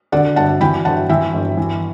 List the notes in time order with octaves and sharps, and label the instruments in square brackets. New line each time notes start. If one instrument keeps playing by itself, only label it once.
[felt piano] D3 D5 F#5
G1 F#5 A5
E3 G5 B5
G1 F#5 A5
E3 E5 G5
G1
E3